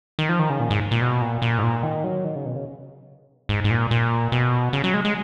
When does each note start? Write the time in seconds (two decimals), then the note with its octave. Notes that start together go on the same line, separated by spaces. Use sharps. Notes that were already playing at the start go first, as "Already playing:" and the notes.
0.19 D#3
0.29 F3
0.39 D#3
0.50 C#3
0.60 A#2
0.70 G#2
0.91 A#2
1.01 B2
1.22 A#2
1.42 A#2
1.58 G#2
1.63 A#2
1.83 D#3
2.04 F#3
2.25 D#3
2.36 C#3
2.46 B2
2.56 C#3
3.49 G#2
3.64 G#2
3.71 A#2
3.91 A#2
4.32 B2
4.73 C#3
4.84 F#3
4.94 G#3
5.05 G#3